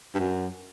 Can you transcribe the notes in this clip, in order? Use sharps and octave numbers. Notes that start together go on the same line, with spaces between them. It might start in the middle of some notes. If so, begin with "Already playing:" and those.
G2
F#2